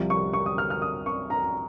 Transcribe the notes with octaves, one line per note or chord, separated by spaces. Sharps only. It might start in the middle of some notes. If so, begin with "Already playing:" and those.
Already playing: C2 C3 F3
C#6
C#6
D#6
F6
F6
D#6
C#6
A#5